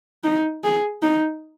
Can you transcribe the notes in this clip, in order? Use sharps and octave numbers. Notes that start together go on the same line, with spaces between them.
D#4
G#4
D#4